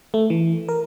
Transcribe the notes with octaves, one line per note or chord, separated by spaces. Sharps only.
A3
E3
A#4